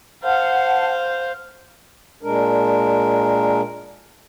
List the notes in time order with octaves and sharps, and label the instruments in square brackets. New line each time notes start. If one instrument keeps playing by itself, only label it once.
[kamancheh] C5 F5 [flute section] F#5 A5
[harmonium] A#2 G#3 D4 A#4